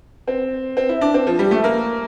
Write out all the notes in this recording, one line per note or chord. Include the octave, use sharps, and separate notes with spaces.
C4
C4
E4
D4
C4
F3
G3
A3
A#3